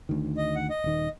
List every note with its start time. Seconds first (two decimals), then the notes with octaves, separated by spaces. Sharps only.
0.09 D2 D#3
0.37 D#5
0.56 F#5
0.70 D#5
0.84 D#1 D#3